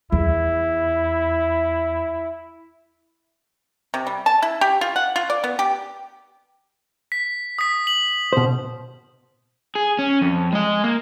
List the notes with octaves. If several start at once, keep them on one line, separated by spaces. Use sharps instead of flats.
E2 E4
C3
G3
A5
E4
G4
F4
F#5
F4
D5
B3
G4
B6
D#6 B6
F#7
B2 C5
G#4
C#4
F2
G#3 D#5
A#3